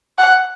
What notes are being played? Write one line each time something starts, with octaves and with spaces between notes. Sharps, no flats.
F#5